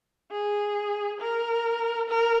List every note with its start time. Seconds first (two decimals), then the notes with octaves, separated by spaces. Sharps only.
0.31 G#4
1.21 A#4
2.09 A#4